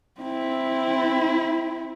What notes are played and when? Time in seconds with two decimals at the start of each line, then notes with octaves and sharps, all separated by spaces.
0.21 C4 E4